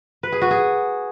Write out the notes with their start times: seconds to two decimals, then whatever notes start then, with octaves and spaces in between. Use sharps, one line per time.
0.23 B4
0.32 G#4
0.42 F#4
0.51 G#4